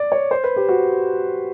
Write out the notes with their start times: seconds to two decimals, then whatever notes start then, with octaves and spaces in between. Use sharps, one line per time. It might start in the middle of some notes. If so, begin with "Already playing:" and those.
Already playing: D5
0.12 C#5
0.31 C5
0.44 B4
0.56 G4
0.69 F#4